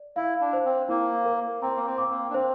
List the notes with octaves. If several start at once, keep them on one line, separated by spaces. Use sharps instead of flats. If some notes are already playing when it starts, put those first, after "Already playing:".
Already playing: D5
E4 F5
D4
C5
C4
A#3 E4
A#4
C4 A#5
A#3
C4
D6
A#3
D4
C4 C5